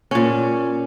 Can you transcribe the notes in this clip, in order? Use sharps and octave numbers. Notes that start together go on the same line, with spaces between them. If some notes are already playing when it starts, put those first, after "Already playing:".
A#2 C#4